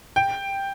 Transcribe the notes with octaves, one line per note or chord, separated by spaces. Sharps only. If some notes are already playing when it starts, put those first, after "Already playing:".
G5